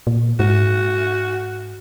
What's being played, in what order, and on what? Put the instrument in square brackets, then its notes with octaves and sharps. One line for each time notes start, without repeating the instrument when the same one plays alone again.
[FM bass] A#2
[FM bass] G#2 [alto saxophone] F#4